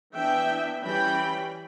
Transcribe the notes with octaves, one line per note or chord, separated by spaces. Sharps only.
E3 B3 D4 E5 G5
E3 G3 C#4 G5 B5